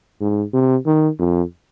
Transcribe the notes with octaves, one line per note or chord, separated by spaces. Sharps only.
G#2
C3
D#3
F2